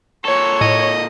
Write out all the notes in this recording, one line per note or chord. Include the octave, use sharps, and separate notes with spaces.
A#2 A4 C#5
A2 D#5